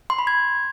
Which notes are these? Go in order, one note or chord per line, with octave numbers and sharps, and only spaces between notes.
C6
B5
G#6